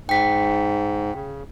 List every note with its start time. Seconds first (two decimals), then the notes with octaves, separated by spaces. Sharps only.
0.09 G#2 G5 B6
1.15 C#3